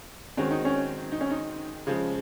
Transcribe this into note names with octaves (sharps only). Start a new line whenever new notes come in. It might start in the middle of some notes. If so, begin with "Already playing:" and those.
D#3 G#3 C4 C#4 F#4
D#4
C#4
D#4
C#4
D#4
C#3 F3 G#3